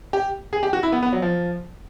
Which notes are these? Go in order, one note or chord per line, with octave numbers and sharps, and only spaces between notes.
G4
G#4
G4
F#4
E4
B3
B3
F#3
F3